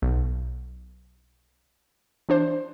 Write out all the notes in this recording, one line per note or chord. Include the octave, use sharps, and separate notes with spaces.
B1
E3 D4 C5